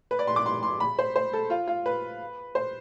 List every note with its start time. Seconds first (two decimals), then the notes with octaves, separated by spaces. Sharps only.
0.11 B4
0.19 D5
0.27 C6
0.36 D6
0.46 C6
0.63 C6
0.80 B5
0.99 C5
1.16 C5
1.33 A4
1.50 F4
1.67 F4
1.86 B4
2.55 C5